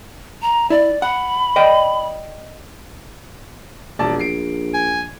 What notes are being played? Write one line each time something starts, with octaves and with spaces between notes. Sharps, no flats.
A#5
E4 D5
F#5 B5
D5 D#5 G5
E1 A#1 D5 A5
C7 D7
G#5